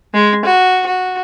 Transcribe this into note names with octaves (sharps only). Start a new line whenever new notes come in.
G#3
F#4
F#4